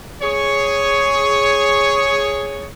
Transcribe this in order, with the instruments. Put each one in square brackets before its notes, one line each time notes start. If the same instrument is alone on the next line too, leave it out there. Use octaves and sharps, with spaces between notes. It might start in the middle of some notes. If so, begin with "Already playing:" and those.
[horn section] G#4 C#5